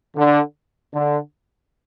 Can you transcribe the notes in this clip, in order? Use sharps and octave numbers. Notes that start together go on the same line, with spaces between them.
D3
D3